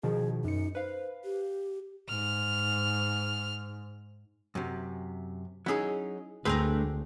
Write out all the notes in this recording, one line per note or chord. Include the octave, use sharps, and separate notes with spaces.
B2 D#3 F3 G#4
F#2 D#4 C#7
B4 C5 F5
G4
G#2 F6
F#2 C3
F#3 C#4 D#4 E4 G#4
D2 A3 C4 D4 G#4 A#4 B4